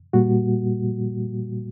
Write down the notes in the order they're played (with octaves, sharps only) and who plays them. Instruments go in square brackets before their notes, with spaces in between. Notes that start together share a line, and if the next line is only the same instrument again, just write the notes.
[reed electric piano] A#2 G3 A#3 F#4